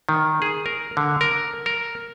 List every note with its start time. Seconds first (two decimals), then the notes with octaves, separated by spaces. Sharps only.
0.09 D#3
0.42 G#4
0.66 A#4
0.97 D3
1.21 A#4
1.66 A#4